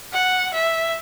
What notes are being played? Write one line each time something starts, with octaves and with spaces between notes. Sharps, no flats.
F#5
E5